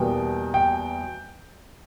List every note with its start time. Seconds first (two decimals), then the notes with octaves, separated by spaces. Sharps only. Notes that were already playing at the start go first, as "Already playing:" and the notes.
Already playing: E2 B2 G3 A#3 G5
0.54 G5